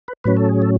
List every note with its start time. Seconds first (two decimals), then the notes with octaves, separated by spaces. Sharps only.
0.08 B4
0.24 A2 F#3 C#4 B4
0.37 A4
0.49 G#4
0.62 A4